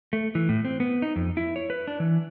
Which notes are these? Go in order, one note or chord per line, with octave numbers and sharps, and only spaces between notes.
A3
E3
A2
C4
B3
D#4
F2
E4
C#5
B4
D4
E3